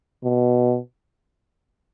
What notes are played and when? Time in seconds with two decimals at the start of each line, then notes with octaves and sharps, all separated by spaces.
0.24 B2